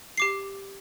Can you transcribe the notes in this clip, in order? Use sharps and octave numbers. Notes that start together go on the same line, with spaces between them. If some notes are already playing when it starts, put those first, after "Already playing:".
G4 D6 C7